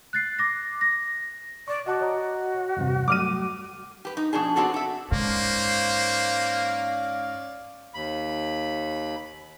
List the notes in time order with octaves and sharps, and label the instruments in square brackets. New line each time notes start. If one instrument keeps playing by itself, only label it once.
[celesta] F#6 A6 C7
D6 A#6
A#6
[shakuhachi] D5 [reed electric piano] C#6
[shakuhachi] F#4 [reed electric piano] D#5 A5 D6
[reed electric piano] C#5 D#5 A#5
E2 G2 C3
[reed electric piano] F#3 G3 A3 [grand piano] D6 F6 D#7
[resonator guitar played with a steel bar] G4 B4
D#4
B2 F3 D4 G#4
B3 C4 D4 F#4 A4
A4 E5
[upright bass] G#2 [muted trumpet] A#3 [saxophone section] C#4 D5 F5 [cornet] C5
[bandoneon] D#2 B5